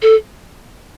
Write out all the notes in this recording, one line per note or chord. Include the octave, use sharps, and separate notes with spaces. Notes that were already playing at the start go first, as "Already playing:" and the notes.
A4